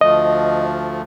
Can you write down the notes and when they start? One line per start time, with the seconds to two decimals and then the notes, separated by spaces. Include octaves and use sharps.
0.01 D2 F3 A3 D#5